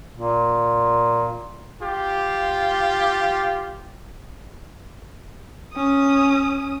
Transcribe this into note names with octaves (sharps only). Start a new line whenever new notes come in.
A#2
F4 G4
C#4 D#6